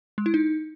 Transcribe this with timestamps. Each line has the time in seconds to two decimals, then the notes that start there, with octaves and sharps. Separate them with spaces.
0.18 G#3
0.26 E4
0.34 D#4